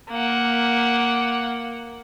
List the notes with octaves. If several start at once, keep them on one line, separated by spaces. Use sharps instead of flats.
A#3 F#5